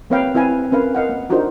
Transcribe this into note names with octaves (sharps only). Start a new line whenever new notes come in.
A#3 C4 B4 C#5 F5 G5
C4 E4 B4 F5 G#5
C4 C#4 A#4 B4 F5
A#4 D#5 F5 F#5
A#3
D4 D#4 F4 F#4 A#4 C5